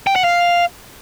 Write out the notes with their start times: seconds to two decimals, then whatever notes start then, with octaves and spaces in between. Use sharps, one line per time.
0.07 G5
0.16 F#5
0.24 F5